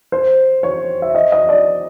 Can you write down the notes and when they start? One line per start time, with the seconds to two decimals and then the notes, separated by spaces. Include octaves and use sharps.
0.12 C5
0.63 C#5
1.02 E5
1.15 D#5
1.32 D#5
1.49 D5